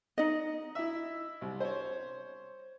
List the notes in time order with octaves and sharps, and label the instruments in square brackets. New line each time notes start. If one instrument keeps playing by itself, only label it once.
[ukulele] D#4 D#5
[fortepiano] E4 E5
C2
C5 C#5